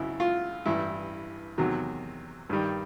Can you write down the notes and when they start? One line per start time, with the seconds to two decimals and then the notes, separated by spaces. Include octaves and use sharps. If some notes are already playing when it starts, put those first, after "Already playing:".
Already playing: G#1 F#2 C#3 E4
0.20 F4
0.66 A1 G2 E3 G3 E4
1.58 E2 C3 D#3 F#3
2.49 G2 D#3 G3